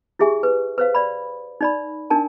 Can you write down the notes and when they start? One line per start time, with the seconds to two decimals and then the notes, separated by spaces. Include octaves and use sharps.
0.19 E4 G4 G#4 E5 G#5 C#6
0.43 B4
0.78 B4 C5 F5
0.95 D5 B5
1.61 D#4 D5 B5
2.10 D4 D#4 A#4 G#5 A5